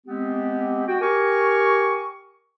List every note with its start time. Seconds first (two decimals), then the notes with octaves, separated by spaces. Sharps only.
0.06 G#3 B3 C4 G4
0.87 F#4 G5
1.01 G4 A#4 G#5 C#6